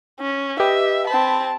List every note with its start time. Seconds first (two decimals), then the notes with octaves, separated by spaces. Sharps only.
0.20 C#4
0.60 G4 B4 D#5 E5
1.07 C4 A5 B5